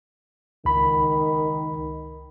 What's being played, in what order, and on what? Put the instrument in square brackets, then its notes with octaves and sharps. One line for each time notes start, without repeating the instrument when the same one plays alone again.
[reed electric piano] C#2 B5 [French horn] D#3